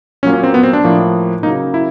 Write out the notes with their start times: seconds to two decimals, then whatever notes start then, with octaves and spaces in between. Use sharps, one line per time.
0.23 A#2 F#3 A#3 C#4
0.33 C#4
0.43 C4
0.54 B3
0.63 C4
0.73 D4
0.84 A2 F3 A#3
1.43 C#3 F#3 A#3 D#4
1.74 E4